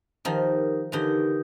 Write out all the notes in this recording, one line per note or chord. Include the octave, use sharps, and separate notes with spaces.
D#3 F3 D#4 G4 A#4
D3 E3 D#4 G4 A#4